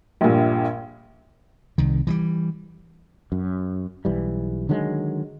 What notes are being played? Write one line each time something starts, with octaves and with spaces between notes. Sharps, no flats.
A#1 G2 A#2
C2 D#3
E3 F#3 G3
F#2
B1 E3 G3
D3 D#3 F#3 G#3